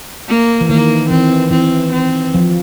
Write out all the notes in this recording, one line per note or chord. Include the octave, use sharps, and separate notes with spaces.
A#3
E3
D#3 A#3
E3 C4
E3 C4
C4
F3